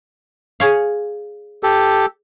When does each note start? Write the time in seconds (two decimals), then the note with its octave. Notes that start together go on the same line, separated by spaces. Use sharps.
0.60 G#4 C#5 F5
1.63 G4 A4